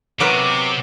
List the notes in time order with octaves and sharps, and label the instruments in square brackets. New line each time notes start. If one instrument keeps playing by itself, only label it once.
[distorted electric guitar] C3 [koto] F#3 B3 A#4 [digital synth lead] D6